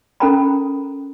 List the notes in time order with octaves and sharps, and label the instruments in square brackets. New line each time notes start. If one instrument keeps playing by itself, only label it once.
[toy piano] C#4 A4 A#4 G5 A#5 B5